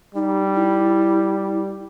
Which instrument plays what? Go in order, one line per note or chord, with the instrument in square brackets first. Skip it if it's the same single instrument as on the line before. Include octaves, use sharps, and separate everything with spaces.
[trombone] G3 [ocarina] D#4
[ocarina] E4